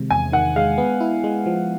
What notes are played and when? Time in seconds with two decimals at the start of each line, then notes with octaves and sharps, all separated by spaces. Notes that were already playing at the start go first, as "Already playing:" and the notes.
Already playing: C3 D#3 G#3
0.10 E2 G#5
0.32 D#3 F#5
0.56 G#3 F5
0.78 B3
1.00 E4
1.24 G#3
1.46 F3